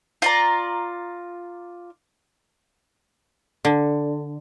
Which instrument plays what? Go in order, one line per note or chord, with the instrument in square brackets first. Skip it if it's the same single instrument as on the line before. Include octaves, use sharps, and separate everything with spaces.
[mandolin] F4 D5 A#5
[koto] D3